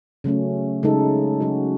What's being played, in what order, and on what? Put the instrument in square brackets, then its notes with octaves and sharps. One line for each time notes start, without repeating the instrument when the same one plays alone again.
[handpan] C#3 F#3 A3 C#4
C#3 G#3 D#4 A4
C#3 F#3 C#4 F#4